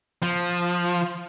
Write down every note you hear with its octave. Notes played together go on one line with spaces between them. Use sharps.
F3